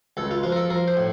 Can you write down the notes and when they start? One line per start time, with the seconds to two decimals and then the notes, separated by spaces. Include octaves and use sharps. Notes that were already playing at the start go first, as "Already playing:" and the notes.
0.17 C#2 A4
0.31 F4
0.43 F3 F4
0.52 A#4
0.56 A4
0.70 F3 A#4
0.88 C5
0.97 A2